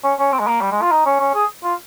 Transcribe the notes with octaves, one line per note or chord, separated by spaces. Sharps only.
C#4
C#4
C4
G#3
A#3
G3
G#3
F4
D#4
C#4
C#4
G#4
F4